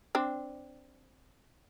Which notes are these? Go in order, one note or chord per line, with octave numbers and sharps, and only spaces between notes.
C4 D4